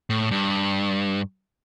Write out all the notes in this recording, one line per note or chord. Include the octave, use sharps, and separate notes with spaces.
A2
G2